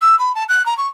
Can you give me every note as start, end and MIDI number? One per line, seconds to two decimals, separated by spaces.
0.01 0.17 88
0.19 0.34 83
0.35 0.44 81
0.48 0.65 90
0.66 0.77 82
0.77 0.88 85